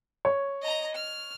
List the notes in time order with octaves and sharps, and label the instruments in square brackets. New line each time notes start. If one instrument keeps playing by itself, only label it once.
[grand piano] C#5
[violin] D#5 A#5
F6